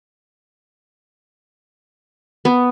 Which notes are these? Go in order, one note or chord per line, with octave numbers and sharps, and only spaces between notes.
B3